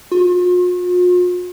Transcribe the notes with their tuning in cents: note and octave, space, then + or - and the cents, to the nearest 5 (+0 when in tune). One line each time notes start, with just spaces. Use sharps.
F4 +45